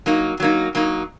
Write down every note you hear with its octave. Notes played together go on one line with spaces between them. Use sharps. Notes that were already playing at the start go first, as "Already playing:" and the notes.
F#3 A#3 D#4
F#3 A#3 D#4
F#3 A#3 D#4